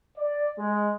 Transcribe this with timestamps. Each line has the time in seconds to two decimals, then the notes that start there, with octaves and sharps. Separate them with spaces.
0.18 D5
0.58 G#3